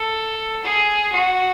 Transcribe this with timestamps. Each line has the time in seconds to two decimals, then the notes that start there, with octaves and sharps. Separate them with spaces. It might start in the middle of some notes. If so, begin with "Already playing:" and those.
Already playing: A4
0.64 G#4
1.12 F#4